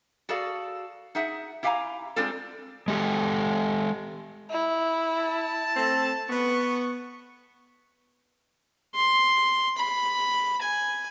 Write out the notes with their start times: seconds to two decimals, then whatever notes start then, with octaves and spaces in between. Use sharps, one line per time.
0.29 F#4 G#4 A4 D5 F5
1.15 D#4 G#4 E5 F#5
1.63 E4 G4 F5 F#5 G#5 A#5
2.16 G#3 C4 D4 F4 A4
2.88 G#3 G4 A4
4.50 E4
5.17 A5
5.76 A3 C4 A4
6.30 B3 C#6
8.95 C6
9.77 B5
10.61 G#5